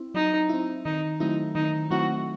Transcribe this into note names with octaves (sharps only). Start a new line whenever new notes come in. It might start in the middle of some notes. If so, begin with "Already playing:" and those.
Already playing: C4 E4
F#3 D#4
C4 E4
D#3 D#4
F#3 A3 C4 D#4 E4
D#3 D#4
F#3 A3 C4 E4 F#4